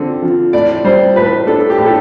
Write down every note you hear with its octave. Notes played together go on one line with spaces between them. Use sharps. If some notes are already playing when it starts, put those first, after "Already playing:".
Already playing: D3 C4
F3
A2 D5
G3 C5
A2 B4
D4 A4
G4
A2
A4